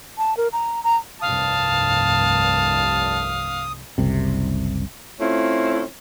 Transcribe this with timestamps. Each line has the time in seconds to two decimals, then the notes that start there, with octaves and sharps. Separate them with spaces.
0.18 A5
0.37 A#4
0.53 A#5
0.84 A#5
1.21 F1 C2 G2 F5 A5 D#6
3.98 F#1 C2 C3
5.20 A3 C4 C#4 E4 F4